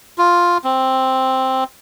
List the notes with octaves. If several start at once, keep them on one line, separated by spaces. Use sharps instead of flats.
F4
C4